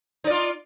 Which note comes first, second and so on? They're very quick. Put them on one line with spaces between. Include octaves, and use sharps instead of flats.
D#4 D5 F4